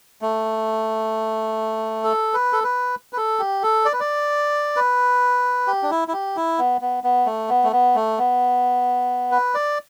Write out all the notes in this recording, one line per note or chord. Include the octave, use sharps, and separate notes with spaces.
A3
A4
B4
A4
B4
B4
A4
G4
A4
D5
B4
D5
B4
G4
D4
E4
E4
G4
E4
B3
B3
B3
A3
B3
A3
B3
A3
B3
B4
D5